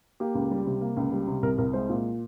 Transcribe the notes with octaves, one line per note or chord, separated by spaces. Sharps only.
A#3 G4
C#2
G3
C3
A#3
C#2
G3
C3
C2 A#4
C2 A#4
G#3 C5
A#2